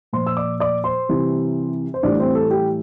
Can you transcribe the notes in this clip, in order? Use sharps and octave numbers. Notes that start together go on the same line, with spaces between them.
A#2 F3 C5 C6
E6
D5 D6
D5 D6
C5 C6
C3 E3 G3
C5
A2 E3 G3 D4 D5
C4 C5
A4
G4